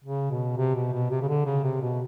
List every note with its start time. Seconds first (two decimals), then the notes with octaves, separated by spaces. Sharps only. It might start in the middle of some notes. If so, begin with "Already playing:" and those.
0.04 C#3
0.31 B2
0.57 C3
0.75 B2
0.93 B2
1.11 C3
1.22 C#3
1.28 D3
1.46 C#3
1.64 C3
1.81 B2